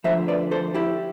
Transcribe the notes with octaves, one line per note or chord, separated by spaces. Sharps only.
D2 D3 F3 C5 E5
B4 D5
A4 C5
E4 G4